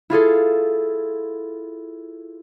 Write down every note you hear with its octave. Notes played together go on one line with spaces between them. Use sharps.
E4 F4 G#4 A4